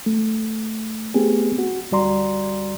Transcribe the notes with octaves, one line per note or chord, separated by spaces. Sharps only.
A3
A3 B3 C4 G4 G#4
F#4
D2 G3 F#4 D5 A#5 C6